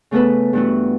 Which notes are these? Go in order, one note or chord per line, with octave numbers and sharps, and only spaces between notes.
C#3 A3 B3 A4 B4
G2 E3 A3 E4 F#4